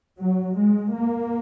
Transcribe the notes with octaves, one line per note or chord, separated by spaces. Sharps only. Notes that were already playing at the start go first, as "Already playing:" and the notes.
F#3
G#3
A#3